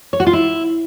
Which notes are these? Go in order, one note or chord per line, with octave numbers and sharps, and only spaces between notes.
C#5
F#4
F4
E4